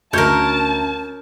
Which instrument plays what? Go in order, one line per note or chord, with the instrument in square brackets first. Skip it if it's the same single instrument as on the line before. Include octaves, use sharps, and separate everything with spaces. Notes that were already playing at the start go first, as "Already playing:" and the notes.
[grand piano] D2 G6 [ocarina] C#4 [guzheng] A#4 C#5 [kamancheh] A5